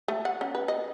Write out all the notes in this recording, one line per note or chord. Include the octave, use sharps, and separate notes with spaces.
A3
F#5
C#4
B4
D#5